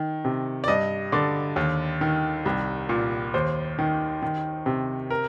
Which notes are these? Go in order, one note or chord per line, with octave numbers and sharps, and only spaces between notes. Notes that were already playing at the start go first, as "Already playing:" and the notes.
Already playing: D#3
C3
D5
G2 D#5
D3 D5
D#2
D#3
C2
A#2
D#2 C5
D#3
D#3
C3
A#4